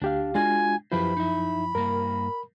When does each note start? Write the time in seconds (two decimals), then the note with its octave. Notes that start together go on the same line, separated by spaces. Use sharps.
0.02 D2 D4 G4 F5
0.35 G#3 D4 F4 F#4 G#5
0.92 F#2 F3 E4 G4 B4 C5 B5
1.17 D#4 E5
1.75 G2 A#3 A#4